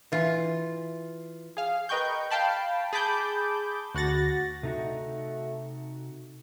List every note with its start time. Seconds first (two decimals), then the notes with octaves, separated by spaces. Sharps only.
0.12 E3 F4
1.57 G#4 F5
1.89 A#4 B4 D#5 G5 C#6 G6
2.31 F5 G5 A5 B5
2.93 G#4 A5 B5 D6 G6
3.95 D2 F#4 F#5 A6 A#6
4.63 C3 A3 D#4 F#4